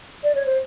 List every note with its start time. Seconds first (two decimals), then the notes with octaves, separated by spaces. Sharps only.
0.24 D5
0.35 C#5
0.46 C5